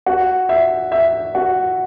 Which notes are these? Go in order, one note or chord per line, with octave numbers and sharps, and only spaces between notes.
F#4
E5
E5
F#4